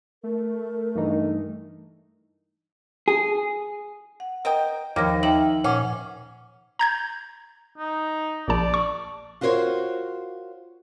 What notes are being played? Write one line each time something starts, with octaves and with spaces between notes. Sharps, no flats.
A3 A#4
G2 E3 D#4
G#4
F#5
A#4 D#5 G5
D#2 C3 D#3 F3 D6 F6 A#6
D#3 E5 G5 F#7
A#2 C#4 F#5 D6
A#5 G6 G#6
D#4
A#1 D5 A5
C#6
F4 F#4 A#4 C5 C#5